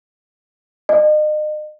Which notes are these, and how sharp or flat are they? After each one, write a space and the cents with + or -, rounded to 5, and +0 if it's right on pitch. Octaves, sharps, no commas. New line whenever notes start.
D#5 -40